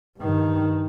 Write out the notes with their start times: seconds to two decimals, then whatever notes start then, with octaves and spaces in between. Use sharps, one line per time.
0.19 G2 D#3